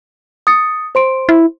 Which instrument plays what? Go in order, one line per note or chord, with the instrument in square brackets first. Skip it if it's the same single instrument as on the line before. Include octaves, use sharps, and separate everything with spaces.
[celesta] D#6 A6 C#7
C5 C6 D7
[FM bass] E4